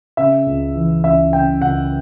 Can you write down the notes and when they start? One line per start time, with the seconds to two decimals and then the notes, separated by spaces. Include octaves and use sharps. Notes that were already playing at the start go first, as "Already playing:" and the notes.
0.17 C#3 E5
0.46 C#2
0.75 E3
1.04 C#2 E5
1.33 C#3 G5
1.62 C#2 F#5